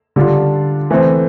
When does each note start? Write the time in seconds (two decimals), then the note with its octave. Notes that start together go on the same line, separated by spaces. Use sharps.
0.16 D3 G3 D4 F4
0.91 E3 A3 C4